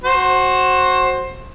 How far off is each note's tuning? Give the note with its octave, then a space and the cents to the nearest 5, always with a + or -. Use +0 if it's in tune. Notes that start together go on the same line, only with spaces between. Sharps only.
F#4 +0 C5 +20